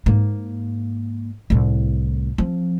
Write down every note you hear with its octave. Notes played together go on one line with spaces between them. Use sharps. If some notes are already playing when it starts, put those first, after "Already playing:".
G#2 A#3
C2 A2
F3 C4